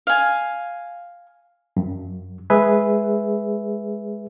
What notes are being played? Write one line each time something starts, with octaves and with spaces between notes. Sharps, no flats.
F5 G#5
F#2
G#3 G#4 B4 E5